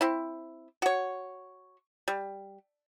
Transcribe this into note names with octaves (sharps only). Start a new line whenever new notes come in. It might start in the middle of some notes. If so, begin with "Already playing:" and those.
C4 E4
F#4 C#5
G3